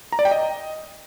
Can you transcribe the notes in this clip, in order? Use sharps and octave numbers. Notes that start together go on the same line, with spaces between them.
A#5
D5
G5
D#5